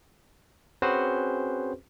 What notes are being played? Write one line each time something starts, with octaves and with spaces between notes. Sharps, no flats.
C4 C#4 F#4 G#4 B4 C5